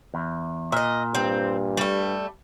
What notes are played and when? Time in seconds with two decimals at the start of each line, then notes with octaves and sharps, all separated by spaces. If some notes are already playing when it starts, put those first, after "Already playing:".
0.14 E2
0.72 A#2 D#5 E5
1.15 G2 C4
1.77 G3 A3